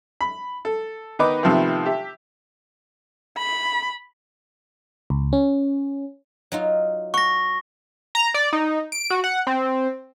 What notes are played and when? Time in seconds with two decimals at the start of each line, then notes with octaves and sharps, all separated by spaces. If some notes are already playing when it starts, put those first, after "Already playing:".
0.21 B5
0.65 A4
1.19 D#3 B3 D#4 B4 D#5 D6
1.43 C3 D#3 F3 A3 B3 C4
1.86 G4 E5
3.37 B5
5.10 C#2
5.33 C#4
6.52 F#3 D#4 F4
7.14 F#5 C#6 A#6
8.15 A#5
8.34 D5
8.53 D#4
8.92 D7
9.10 F#4
9.24 F#5
9.47 C4